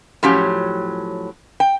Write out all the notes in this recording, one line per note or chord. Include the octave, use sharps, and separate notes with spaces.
A2 F3 F#3 C#4 G4
G5